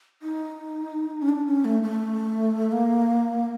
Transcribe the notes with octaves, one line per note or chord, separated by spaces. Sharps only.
D#4
C#4
D4
C#4
A3
A3
A#3